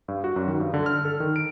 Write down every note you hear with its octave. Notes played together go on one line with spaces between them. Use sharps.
G2
F#4
F#2
D#3
G2
D3
F6
A4
D#3
D7